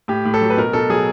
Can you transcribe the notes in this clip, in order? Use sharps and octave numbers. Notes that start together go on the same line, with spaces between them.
A2 G4
A2
A4
F#3
B4
B2 A#4
B2 A4
F#3 G#4